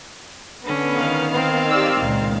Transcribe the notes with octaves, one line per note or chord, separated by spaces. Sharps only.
D3 B3 C#4
D#3 F5
C4
G4 D5 E6
C#2 A#2